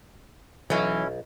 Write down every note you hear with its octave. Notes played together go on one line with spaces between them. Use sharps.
B1 E3 F#3 C#4 E4